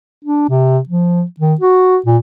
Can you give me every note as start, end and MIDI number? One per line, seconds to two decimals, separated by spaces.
0.25 0.45 62
0.49 0.79 48
0.89 1.24 53
1.40 1.55 51
1.61 1.98 66
2.06 2.18 46